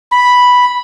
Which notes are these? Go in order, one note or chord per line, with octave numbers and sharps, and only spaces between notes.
B5